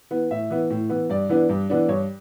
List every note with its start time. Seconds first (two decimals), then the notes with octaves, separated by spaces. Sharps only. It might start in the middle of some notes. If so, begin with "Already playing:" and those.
0.10 E3 B3
0.31 A2 E5
0.50 E3 B3
0.70 A2
0.90 E3 B3
1.10 G2 D5
1.29 E3 B3 D4
1.49 G2
1.70 E3 B3 D4
1.88 G2 C#5